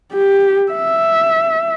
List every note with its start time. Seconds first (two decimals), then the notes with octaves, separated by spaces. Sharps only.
0.13 G4
0.72 E5